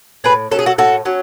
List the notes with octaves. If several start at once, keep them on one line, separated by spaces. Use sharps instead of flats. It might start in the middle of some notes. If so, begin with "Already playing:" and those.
A2 G#4 B4
F#3 C#4 A4
G#4
F#4 A4
A2 F#4 A4
F#3 C#4